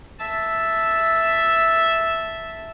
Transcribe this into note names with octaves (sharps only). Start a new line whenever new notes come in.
E5 A5